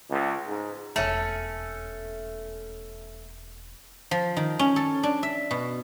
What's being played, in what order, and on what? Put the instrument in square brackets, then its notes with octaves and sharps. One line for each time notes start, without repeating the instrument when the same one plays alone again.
[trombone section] C#2
G#2
[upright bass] E1 D#2 [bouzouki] A3 C#4
[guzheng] F3
D#3
C#4
A4
D4
E5
B2